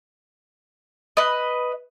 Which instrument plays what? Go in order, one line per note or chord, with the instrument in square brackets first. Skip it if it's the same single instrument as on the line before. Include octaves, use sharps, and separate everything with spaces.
[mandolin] B4 D#5